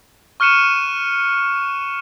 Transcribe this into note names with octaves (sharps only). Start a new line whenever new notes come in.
C#6 F6 F#6 C#7 D#7 E7